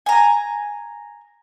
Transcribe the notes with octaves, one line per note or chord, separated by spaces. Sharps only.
G#5 A#5